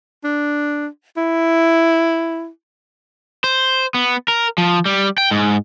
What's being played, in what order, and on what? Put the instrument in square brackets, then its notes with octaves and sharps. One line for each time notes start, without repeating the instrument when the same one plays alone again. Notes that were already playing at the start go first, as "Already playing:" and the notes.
[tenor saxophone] D4
E4
[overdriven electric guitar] C5
B3
A#4
F3
G3
G5
G#2